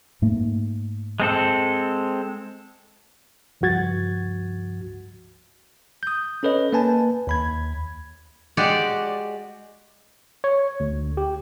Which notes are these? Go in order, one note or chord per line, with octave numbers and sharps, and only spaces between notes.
G#2 A3 A#3
G#3 C4 A4
C#2 G2 F3 F#4 G#6 A6
D#6 G6
C#4 A4 B4 C#5 D#5
A#3 B4 G#5 A5
D#2 B5 G#6
G#3 F#4 G4 D5
C#5
D2
G4